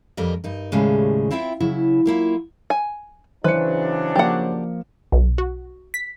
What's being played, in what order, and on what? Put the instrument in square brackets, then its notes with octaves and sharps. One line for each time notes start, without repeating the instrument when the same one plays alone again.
[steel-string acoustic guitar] F2 G3 A#4 D#5
G2 D#4 A#4
D#2 A2 C#3 G3 G#3 C#4
C4 E4 F4 E5 G5
C#3 F#3 E4
F#3 A#3 E4 F4
[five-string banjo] G#5
[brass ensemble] C#3 F#3 D4 [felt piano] E3 C#7 [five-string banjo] B4 [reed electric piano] C5
[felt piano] F3 A#3 [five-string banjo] G4 F#5
[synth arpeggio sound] B1
F#4
B6